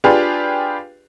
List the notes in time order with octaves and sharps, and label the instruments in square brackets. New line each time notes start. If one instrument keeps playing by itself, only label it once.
[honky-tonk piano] D4 F4 G4 G#4 B4